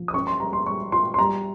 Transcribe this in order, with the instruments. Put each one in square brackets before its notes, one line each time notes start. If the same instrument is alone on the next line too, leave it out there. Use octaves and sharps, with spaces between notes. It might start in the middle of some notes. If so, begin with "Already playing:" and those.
Already playing: [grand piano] F3
D#6
C#4 C#6
C6
G3 A#5
C6
G3 C#6
F4 C6
C6
G3 A#5